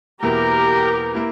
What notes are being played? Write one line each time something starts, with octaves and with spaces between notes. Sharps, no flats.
E2 B2 A#3 E4 G4 A#4
A#3 E4